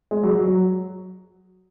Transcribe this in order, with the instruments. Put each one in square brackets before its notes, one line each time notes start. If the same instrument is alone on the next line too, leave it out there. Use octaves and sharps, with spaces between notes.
[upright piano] G#3
F#3
F#3
F#3